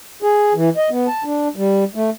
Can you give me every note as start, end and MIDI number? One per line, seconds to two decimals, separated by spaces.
0.22 0.53 68
0.55 0.69 52
0.77 0.89 75
0.90 1.07 59
1.07 1.24 81
1.24 1.48 62
1.56 1.84 55
1.95 2.10 57